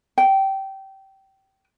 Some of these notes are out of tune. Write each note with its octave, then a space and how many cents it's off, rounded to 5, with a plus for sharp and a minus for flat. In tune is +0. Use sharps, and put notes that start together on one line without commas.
G5 -20